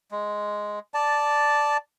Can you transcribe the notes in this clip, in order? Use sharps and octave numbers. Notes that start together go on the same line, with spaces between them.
G#3
D5 A5